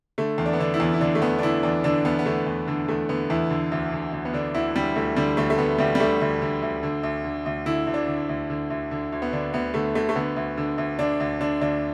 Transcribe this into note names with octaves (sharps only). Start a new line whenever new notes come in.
D3 A3
E2
D4
B3
D3 D4
E4
E2
E4
D3 D4
A3
E2 B3
D4
D3 E4
E2 D4
D3 D4
E2 B3
B3
D3 A3
E2
D3
E2 A3
D3 B3
E2 E4
D3
D2
D3
D2
B3
D3 D4
D2 E4
D3 G3
D2 A3
D3 G3
D2 A3
A3
D3 B3
D2 G3
G3
D3 A3
D2
D3
D2
D3
D2
D3
D2
D3 E4
D2
D4
D3
D2
D3
D2
D3
D2
B3
D3 D4
D2 B3
D3 A3
D2 A3
A3
D3 B3
D2
D3
D2
D3 D4
D2
D3 D4
D2 D4